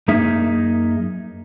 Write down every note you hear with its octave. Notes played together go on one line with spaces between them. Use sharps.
F#2 A#3 D#4 G#4 E5